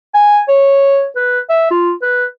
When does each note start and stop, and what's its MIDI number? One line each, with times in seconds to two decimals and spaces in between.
0.14 0.40 80
0.48 1.06 73
1.16 1.40 71
1.50 1.69 76
1.71 1.93 65
2.02 2.25 71